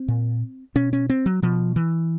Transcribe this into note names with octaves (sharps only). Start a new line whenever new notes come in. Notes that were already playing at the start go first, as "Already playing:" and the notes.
Already playing: C4
A#2
B2 C#4
C#4
C4
F#3
B2 F3
E3